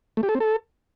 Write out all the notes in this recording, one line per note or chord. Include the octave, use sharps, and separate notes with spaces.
A3
G4
A4
C4
A4